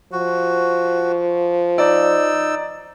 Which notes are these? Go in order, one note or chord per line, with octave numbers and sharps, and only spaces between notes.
F3 F#4
D#4 D5 E6